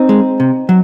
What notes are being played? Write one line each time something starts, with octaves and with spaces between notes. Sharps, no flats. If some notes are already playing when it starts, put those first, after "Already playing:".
Already playing: C4 D#4
G#3
C3
F#3